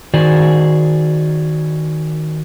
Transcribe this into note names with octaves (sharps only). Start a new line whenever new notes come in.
D#3 F#4 G#4 C5 D5